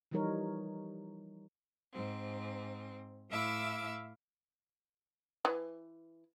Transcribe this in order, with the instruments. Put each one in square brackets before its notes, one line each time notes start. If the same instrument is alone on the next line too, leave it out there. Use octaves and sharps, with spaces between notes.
[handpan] E3 F3 G3 D#4 A#4 C#5
[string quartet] G#2 C4
A2 E4 E5 F5 D6 E6
[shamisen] E3